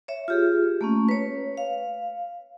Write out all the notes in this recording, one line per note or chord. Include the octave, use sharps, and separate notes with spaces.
C#5 E5
F4 G4 G#4
A3 A#3 C#4
B4 C#5
F5